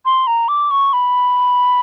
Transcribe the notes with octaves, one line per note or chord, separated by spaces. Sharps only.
C6
A#5
D6
C#6
B5